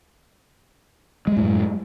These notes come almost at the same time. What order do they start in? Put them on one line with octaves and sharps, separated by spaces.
G#3 G3 A2 F#2